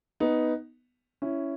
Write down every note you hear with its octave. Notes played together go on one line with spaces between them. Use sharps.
B3 D#4
C#4 E4